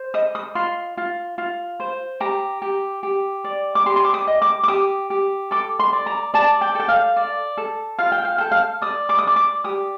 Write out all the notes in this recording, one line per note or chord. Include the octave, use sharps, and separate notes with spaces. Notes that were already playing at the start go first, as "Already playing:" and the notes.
Already playing: C5
D#5 D#6
D#6
F4 C6
F4
F4
C5
G4 A#5
G4
G4
D5
D6
G4 C6
C6
D6
D#6
D#5
D6
D6
G4 D#6
G4
A4 D6
C6
D5
A#5
D5 A5
G5
A4 G5
F5
D5
A4
F4 F5
G5
F5
A4 G5
F5
D5 D#6
D6
D#6
D5 D6
D6
G4 D#6